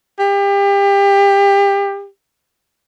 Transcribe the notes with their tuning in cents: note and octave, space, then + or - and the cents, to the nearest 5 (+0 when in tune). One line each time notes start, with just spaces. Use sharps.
G4 +30